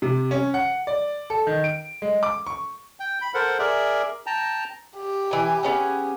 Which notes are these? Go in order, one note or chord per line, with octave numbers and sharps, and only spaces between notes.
C3
C#4
F#5
D5
A4
D#3
D7
G#3
D6
C#6
G5
B5
A4 A#4 C5 F#5
G#4 A#4 D5 E5
G5 A5 A#5
G4
E3 G#5
B3 C#4 G#4